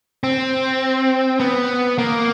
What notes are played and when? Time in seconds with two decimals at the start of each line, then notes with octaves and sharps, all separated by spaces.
0.24 C4
1.40 B3
1.98 A#3